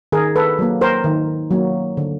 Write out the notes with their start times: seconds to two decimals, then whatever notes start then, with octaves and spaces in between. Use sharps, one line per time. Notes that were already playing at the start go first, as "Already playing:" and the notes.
0.12 D#3 G#4 A#4
0.36 A4 B4
0.59 F#3 A#3
0.81 A#4 C5
1.04 D#3
1.51 F#3 A#3
1.97 D3